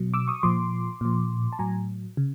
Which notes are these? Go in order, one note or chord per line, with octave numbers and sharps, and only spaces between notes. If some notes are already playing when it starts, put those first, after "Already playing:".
Already playing: B2 F#3
D6 E6
C#6 D#6
A#2 F3 C6 D6
A#2 F3
A5
A2 F#3 G#5 A#5
C#3